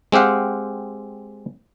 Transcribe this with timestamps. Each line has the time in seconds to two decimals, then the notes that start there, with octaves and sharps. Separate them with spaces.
0.12 G#3 C4 G4 F5 F#5